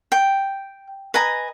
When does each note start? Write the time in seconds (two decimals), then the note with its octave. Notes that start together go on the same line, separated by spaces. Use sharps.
0.12 G5
1.14 B4 D#5 G#5 A#5